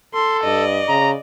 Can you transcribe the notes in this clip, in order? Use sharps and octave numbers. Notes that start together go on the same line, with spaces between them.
A4 C6
G2 D5 D#5
C#3 A#5